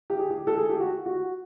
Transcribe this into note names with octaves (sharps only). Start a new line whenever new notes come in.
G4
G#4
G4
A4
G#4
G4
F#4
F#4